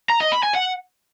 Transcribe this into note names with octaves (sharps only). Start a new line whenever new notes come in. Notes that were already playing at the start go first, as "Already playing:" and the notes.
A#5
D#5
B5
G#5
F#5